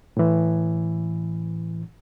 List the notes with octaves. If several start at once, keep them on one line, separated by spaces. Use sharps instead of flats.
A2 E3